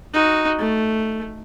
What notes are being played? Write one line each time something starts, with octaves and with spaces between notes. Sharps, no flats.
D#4 F#4
A3